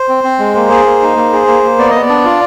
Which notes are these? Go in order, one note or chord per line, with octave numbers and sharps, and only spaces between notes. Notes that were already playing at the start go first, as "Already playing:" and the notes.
Already playing: C5
C4
C4
G#3
A#3
G#4
A#3
D#4
A#3
G#4
A#3
A#3
B3 D5
B3 D#5
D5
D4
F4